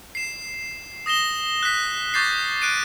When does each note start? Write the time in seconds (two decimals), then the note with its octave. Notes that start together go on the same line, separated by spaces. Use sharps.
0.15 C7 E7
1.06 D#6 A#6 E7 G7
1.63 F#6 B6
2.14 C#6 D6 G6 A6 A#6 C7
2.62 F#6 D7 D#7